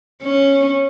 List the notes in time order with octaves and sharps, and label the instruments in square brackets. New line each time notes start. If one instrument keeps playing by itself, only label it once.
[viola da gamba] C#4